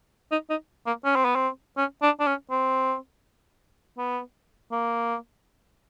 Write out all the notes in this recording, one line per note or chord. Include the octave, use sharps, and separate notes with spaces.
D#4
D#4
A#3
C#4
C4
B3
C4
C#4
D4
D4
C#4
C4
B3
A#3